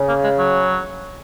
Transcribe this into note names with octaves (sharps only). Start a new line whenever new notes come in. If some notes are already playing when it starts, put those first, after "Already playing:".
Already playing: C#3
A#3
G#3
F#3